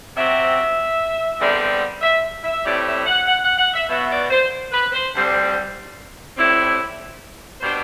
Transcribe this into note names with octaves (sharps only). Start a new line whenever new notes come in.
C3 F#3 C4 E5
E2 D3 G3 C4
E5
E5
A2 G3 C4 E4 D5
E5
F#5
F#5
F#5
F#5
E5
B2 F#3 B3 E5
D5
C5
B4
C5
D2 D3 G3 C4
A2 G3 C4 E4
B2 G3 D4 C5